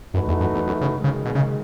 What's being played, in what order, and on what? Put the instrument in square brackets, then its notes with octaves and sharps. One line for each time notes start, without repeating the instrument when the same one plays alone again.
[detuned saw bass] F#2 [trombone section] E3 A3 D#4 F#4 B4
[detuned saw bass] E2
F#2
E2
F#2
C#3
[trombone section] F#2 D#3 G#3
[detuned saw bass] C#3
B2
C#3